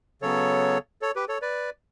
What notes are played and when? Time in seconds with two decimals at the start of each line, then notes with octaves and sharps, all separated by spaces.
0.22 C#3 F#3 B3 A4 C#5
1.02 A4 C#5
1.16 G4 B4
1.28 A4 C#5
1.42 B4 D5